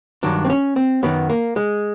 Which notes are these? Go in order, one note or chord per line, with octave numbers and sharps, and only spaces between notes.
G2 D#3 F#3 D4
C4
C#4
C4
F#2 D#3 F#3 B3
A#3
G#3